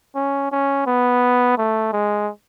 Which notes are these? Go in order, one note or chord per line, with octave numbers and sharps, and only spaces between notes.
C#4
C#4
B3
A3
G#3